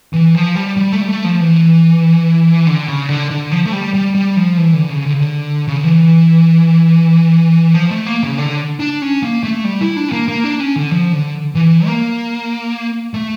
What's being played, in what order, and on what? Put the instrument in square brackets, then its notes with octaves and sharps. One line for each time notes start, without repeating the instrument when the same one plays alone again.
[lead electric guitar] E3
F3
G3
G3
A3
G3
A3
F3
E3
D3
C#3
D3
D3
F3
A3
G3
G3
G3
F3
E3
D3
C#3
D3
C#3
D3
C#3
D3
E3
F3
A3
A#3
C#3
D3
D4
C#4
A#3
A3
G3
E4
D4
C#4
A#3
A#3
D4
C#4
D3
F3
D3
E3
A#3
A3